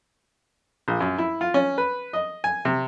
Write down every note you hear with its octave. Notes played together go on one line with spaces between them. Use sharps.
A#1
F#2
E4
F4
C#4
B4
D#5
G#5
C3